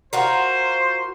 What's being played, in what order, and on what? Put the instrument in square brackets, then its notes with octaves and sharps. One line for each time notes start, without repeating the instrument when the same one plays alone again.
[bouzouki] F4 F#4 A#4 [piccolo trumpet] C5